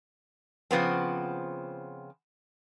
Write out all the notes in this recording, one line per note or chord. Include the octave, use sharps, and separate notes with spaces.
C#3 F3 B3 C4